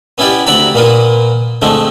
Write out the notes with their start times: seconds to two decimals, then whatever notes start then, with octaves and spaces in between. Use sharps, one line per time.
0.18 B3 C#4 E4 G4 D5 G5
0.47 D2 C4 F#4 D5 A#5 B5
0.74 A#2 A#3 B3 F4
1.62 D3 F3 G#3 A3 C4